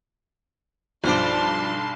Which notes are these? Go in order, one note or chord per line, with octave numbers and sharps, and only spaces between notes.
B1 G2 F3 C5 D5 A5 C6